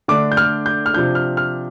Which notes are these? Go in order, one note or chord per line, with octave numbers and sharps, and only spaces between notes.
D3 A3 D4 D6
G6
F6
G6
F6
C3 F3 D4 G6
F6
F6